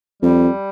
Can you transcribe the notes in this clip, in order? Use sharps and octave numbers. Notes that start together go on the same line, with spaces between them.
F2 G3